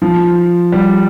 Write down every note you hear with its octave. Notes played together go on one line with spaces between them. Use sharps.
F3
G3